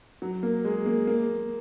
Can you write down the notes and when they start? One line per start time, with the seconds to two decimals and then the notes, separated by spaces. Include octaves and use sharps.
0.22 F#3
0.43 A#3
0.65 G#3
0.86 A#3
1.07 A#3